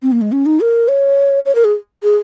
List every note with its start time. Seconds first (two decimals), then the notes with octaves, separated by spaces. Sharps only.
0.02 C4
0.12 A#3
0.21 G#3
0.32 C#4
0.46 D#4
0.61 A#4
0.88 C#5
1.46 C#5
1.55 A#4
1.64 G#4
2.03 G#4